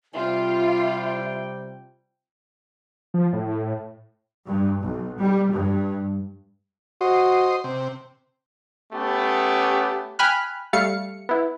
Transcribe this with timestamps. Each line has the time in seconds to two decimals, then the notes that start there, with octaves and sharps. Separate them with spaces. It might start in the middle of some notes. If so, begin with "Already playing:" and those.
0.15 C3 G3 F4 E5 G5
3.14 F3
3.33 A2
4.47 G2
4.82 B1
5.19 G3
5.51 G2
7.01 F#4 C5 D#5
7.64 C3
8.93 A3 B3 C#4 G4
10.19 G5 G#5 B5 F6 F#6
10.73 G3 A3 F5 C#7
11.29 B3 E4